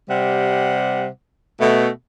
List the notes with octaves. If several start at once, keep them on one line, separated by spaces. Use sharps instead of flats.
C3 G3 F#5
B2 A3